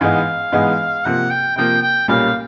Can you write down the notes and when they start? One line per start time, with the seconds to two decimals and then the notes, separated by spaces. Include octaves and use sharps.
0.01 G#2 E3 G#3 B3 D#4 F5
0.52 G#2 E3 G#3 B3 D#4
1.05 C3 F3 A#3 F#5
1.31 G5
1.56 C3 F3 A#3 G5
1.82 G5
2.08 B1 A#2 G3 A#3 C#4 F5